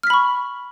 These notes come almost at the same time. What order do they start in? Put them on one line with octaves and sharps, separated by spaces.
F6 B6 B5 C#6